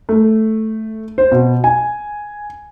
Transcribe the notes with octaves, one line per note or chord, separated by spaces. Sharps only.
A3
C5
B2
G#5